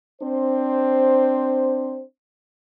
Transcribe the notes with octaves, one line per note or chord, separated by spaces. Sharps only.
C4 D4 C5